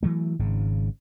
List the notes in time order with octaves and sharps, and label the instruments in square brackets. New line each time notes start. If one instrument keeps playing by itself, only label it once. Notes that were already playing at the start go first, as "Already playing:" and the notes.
[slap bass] E3 F#3 A3
G#1 G#2 C#3